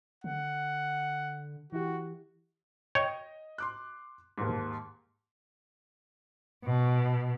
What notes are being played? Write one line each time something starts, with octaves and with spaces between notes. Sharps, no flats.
D3 F#5
E3 E4 F#4 G4
C#5 D#5 G5
C6 D6 F#6
D#2 G#2
B2